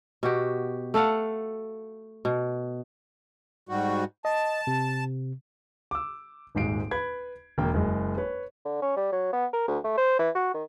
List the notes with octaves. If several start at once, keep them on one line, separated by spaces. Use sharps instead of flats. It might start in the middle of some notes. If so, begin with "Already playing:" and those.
B2 F#4 G4
A3 A4 F5 F#5
B2
G#2 G3 F#4
D#5 A5
C3
D6 E6
D#1 G#1 G#2 G#3 C7 D7
B4 B5 G#6
E1 A#3 G5
F#1 G#3
B4 C#5
D3
C#4
G3
F#3
B3
A#4
D2
A3
C5
E3
F#4
D#3